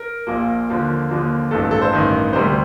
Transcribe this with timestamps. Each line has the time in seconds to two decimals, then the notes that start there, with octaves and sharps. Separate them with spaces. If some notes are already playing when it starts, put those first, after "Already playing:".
Already playing: A#4
0.27 A#1 A#2 F3 A#3
0.68 D#2 D3 F3 A#3
1.09 D#2 D3 F3 A#3
1.51 A1 G2 D#3 A4
1.71 A4
1.81 C5
1.93 A1 G2 D#3
2.33 D2 C3 G3 C5